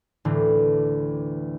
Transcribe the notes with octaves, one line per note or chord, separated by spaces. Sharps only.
A1 D2 A2 D3 E3